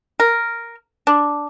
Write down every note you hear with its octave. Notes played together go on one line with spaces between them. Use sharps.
A#4
D4